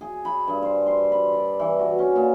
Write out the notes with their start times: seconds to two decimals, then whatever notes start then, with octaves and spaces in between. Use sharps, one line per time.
0.01 G#4
0.25 B5
0.48 G2
0.62 C5
0.86 C6
1.12 B5
1.33 D5
1.59 E3
1.79 F#4
1.99 C#4
2.16 A#2